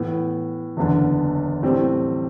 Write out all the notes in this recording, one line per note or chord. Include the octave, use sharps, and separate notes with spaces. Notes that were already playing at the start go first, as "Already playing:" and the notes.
Already playing: A2 E3 B3
F#1 E2 D3
A2 G3 C4